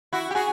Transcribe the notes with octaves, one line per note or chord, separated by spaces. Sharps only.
E4 F#4
G4
F#4 G#4